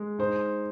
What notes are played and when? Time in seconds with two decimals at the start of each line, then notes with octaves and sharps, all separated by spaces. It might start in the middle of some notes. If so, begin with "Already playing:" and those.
Already playing: G#3
0.19 D#4 C5